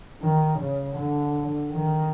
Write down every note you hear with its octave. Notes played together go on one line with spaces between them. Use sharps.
D#3
C#3
D3
D#3